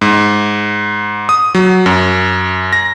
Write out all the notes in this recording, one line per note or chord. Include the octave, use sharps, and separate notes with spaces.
G#2
D#6
F#3
F#2
A#6